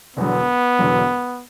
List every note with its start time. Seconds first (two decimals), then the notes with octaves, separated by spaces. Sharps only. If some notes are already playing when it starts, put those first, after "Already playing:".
0.17 E1 E2 D3 F#3 B3
0.79 E1 E2 D3 F#3